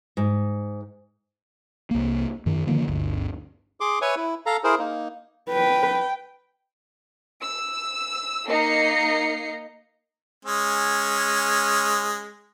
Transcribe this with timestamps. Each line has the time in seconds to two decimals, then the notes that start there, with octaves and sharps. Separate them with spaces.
0.17 G#2
1.91 C2 A#3
2.46 F#2 D#3
2.67 D3 D#3 F3 A#3
2.87 G1 D2
3.80 G#4 C6 D6
4.02 B4 C#5 E5 G#5 C#6
4.16 E4
4.46 A4 F5 A#5
4.64 E4 G#4 A#4 C5
4.79 A#3 D#4
5.49 B4 G5
7.40 E6
8.47 A#3 D#4 D#5 A#5 C7 C#7
10.45 G#3 C#4